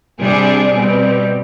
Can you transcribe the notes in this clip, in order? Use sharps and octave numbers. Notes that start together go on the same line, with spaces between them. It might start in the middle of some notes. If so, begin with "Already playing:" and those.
C3 G3 D4 G#4
B2 G3 C4